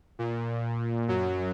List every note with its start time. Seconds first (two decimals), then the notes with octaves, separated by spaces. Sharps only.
0.19 A#2
1.08 F#2 F#3